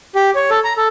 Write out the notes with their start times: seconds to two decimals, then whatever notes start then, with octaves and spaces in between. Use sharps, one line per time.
0.15 G4
0.35 C#5
0.50 A4
0.64 A#5
0.77 A4